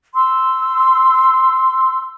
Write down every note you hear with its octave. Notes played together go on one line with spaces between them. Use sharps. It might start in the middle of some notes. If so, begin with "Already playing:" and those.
C6 E6